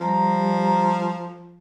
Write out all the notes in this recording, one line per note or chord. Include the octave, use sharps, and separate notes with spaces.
F3 G3 A#5